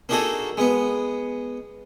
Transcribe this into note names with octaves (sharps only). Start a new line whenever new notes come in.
A#3 D4 D#4 F#4 G#4 A4
G#3 B3